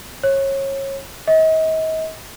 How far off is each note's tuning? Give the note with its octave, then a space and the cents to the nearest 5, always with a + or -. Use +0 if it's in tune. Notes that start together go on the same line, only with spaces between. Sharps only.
C#5 -25
D#5 +40